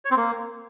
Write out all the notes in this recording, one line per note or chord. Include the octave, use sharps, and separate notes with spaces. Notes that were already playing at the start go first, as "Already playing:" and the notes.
C#5
C4
A#3